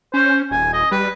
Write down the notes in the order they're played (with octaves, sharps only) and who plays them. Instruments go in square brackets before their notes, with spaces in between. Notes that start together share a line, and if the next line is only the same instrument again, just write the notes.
[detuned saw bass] C#4 [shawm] C5
[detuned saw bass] D#1 [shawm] G#5
[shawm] D#5
[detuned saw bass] G3 [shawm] B4